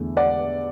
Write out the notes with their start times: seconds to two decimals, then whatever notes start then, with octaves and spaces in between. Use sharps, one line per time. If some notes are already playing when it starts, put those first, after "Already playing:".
Already playing: E2 D3 A3
0.17 D5 F#5